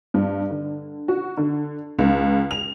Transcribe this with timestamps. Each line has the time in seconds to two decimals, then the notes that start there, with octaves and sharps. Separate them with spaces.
0.14 G2
0.50 D3
1.08 F#4
1.37 D3
1.99 C#2
2.51 F7